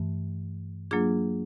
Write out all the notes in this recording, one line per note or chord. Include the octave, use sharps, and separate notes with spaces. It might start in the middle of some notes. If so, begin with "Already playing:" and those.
Already playing: G2 E3 A3
F#3 A#3 D4 F4 G#4